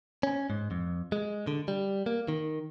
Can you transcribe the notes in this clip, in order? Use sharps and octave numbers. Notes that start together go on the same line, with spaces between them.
C#4
G#2
F2
G#3
D3
G3
A#3
D#3